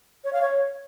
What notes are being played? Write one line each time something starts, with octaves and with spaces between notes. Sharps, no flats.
C#5
F5
C#5